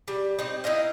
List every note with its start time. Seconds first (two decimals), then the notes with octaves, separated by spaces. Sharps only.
0.08 G3
0.39 C4 D#4
0.64 D#4 E4 D#5 F5